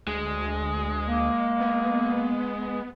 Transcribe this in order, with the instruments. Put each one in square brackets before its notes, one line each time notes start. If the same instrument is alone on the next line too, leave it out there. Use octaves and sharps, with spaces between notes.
[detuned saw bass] D2 [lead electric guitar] G#3
[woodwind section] A#3
[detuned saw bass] B3